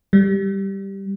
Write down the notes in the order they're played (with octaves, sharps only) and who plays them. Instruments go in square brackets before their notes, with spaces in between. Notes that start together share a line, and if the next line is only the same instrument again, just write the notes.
[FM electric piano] G3